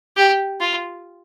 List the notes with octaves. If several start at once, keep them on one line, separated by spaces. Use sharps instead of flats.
G4
F4